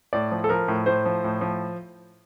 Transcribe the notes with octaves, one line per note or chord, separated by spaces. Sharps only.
A2 D5
F3
A4
F3 A#4
A2
A2 C5
F3
A2
F3